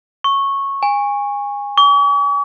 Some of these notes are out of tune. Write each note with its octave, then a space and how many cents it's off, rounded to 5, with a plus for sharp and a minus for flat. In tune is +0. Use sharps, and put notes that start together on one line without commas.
C#6 -10
G#5 -25
C#6 +45